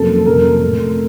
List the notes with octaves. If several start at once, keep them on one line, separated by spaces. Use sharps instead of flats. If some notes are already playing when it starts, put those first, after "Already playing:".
Already playing: F2 C3 F#3 A#3 C#4 A4
F2 C3 F#3 A#3 C#4 A#4
A2 A3 C4